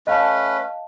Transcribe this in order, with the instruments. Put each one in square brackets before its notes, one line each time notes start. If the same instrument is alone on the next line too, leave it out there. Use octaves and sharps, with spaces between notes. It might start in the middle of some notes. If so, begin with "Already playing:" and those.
[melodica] A3 C#4 B4 [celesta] D#5 F5 A5